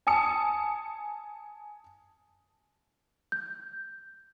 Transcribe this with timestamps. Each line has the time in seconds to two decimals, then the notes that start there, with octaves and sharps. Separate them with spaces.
0.07 G#5 A5 D#6 C#7
3.32 G6